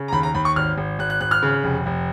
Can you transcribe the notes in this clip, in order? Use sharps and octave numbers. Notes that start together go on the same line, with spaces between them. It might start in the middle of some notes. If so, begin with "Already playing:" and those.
Already playing: C#3
A#5
D#2 B5
A#5
D#2 B5
C#6
G#1 F6
G#1
G#1 F#6
F#6
G#1 F#6
F6
C#3
F1
F1